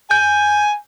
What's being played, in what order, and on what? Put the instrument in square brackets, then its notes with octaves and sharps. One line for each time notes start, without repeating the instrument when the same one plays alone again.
[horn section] G#5 [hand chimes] G6